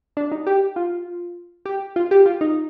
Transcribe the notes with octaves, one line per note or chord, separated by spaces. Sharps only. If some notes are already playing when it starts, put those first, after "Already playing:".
D4
D#4
G4
F4
G4
F4
G4
F4
D#4